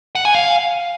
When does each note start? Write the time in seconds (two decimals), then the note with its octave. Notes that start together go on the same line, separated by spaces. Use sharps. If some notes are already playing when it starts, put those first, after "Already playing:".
0.15 F#5
0.25 G#5
0.35 F5